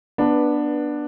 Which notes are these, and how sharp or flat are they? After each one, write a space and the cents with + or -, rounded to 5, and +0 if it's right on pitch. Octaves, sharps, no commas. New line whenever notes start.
B3 -15 D4 +10 B4 -5